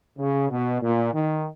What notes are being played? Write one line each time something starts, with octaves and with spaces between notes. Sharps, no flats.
C#3
B2
A#2
D#3